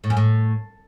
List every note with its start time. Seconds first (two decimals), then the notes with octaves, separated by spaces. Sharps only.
0.04 A2
0.10 F#2
0.17 A2